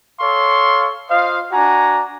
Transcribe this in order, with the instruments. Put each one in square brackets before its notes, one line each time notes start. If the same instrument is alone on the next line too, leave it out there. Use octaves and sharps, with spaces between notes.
[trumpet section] A4 C#5 F5 C6 C#6
F4 C5 D#5 F5
D4 F#4 G#5 A#5